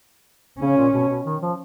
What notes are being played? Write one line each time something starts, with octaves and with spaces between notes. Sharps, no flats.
C#3 C#4
A#2
B2
B2
D#3
F3